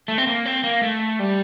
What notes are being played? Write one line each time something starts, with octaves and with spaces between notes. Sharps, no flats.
A3
C4
A#3
C4
A#3
A3
G3